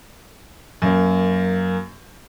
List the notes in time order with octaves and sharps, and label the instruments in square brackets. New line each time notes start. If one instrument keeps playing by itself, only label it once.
[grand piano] F#2 A#3